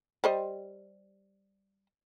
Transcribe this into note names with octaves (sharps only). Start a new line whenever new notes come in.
G3 C5 D#5